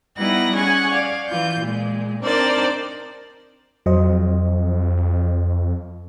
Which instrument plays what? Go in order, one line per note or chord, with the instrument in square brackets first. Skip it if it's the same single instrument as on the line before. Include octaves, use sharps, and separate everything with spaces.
[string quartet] G3 B3 D#4 E4 F#5 A#6
C#4 G#4 F#5 G#5 C#6
D5 F5
E3 F4 G6
A#2 G#3
C4 D4 D#4 A#4 C5 D5
[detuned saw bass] F2 [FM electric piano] F#3 C5 D#5